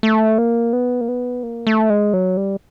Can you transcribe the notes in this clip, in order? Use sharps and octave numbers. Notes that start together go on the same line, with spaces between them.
A3
A#3
B3
A#3
B3
A#3
A3
G#3
F#3
G3